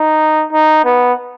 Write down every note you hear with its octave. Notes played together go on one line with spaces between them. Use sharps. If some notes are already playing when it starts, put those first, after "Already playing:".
Already playing: D#4
D#4
B3